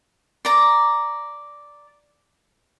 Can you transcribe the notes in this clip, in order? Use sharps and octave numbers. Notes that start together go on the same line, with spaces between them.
D5 A#5